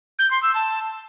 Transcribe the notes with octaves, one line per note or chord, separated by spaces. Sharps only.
G6
C6
E6
A5